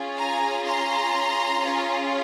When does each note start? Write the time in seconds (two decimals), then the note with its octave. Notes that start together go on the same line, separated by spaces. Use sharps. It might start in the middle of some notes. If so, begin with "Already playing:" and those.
Already playing: C#4 F4 G#4
0.18 G#5 A#5
0.65 A#5 C6
1.60 C#4 F4 G#4